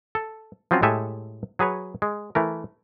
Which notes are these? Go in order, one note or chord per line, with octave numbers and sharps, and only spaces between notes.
A4
F3 F#3 C4 C#4 F4 F#4
A2 G#3 G4 A4 E5 G#5
F#3 G#4 B4 C#5
G#3
E3 A3 A#4